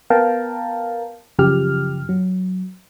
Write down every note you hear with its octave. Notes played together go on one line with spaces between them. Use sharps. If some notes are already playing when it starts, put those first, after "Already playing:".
B3 A#4 F5 G5 A5 A#5
F#2 C#3 F3 G4 F6
F#3